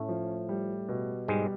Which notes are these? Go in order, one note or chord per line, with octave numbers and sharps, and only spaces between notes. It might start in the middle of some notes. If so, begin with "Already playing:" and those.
Already playing: A2 A3 C#4
F3
G3
B2
G#2 G3 G#3